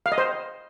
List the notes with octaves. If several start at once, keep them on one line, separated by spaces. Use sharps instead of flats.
F5
D#5
C5